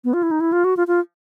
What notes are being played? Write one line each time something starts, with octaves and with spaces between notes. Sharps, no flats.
B3
F4
E4
D#4
E4
F4
F#4
F4
F4